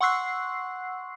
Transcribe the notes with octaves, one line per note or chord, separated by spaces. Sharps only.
F#5 C6 C#6 E6 F#6 C7